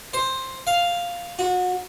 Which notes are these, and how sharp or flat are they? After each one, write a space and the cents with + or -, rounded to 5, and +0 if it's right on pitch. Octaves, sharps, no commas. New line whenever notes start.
C5 +10
F5 +0
F#4 -30